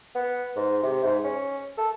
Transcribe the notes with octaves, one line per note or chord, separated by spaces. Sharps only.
B3
G#2
C3
G#2
C#4
A4